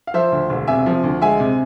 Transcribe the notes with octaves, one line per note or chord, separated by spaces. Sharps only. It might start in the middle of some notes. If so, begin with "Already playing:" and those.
F5
F3 C5 E5
D2
E1
C3 E5 G#5
F3
D2
G#3 E5 G#5
C3